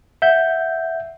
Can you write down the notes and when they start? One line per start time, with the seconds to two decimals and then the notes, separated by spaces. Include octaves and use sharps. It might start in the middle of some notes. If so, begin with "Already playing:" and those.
0.22 E5 F#5 G6